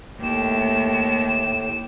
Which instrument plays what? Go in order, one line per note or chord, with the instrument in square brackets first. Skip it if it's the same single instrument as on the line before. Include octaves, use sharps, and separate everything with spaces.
[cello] D#2 [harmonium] A2 [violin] G4 E7